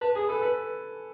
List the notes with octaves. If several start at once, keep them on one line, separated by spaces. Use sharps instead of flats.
B4 A5
G#4 G#5
A4 B4
A4 B4